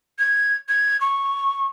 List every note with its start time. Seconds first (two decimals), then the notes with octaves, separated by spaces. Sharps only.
0.19 G#6
0.69 G#6
1.01 C#6